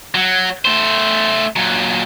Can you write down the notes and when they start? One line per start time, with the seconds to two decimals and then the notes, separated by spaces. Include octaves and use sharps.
0.15 F#3
0.65 A3 C5
1.56 A#2 F#3